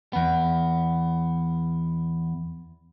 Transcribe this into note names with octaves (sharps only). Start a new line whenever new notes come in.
E2 B3